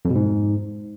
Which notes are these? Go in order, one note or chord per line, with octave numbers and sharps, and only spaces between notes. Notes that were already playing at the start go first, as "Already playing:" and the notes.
F2
B2
G#2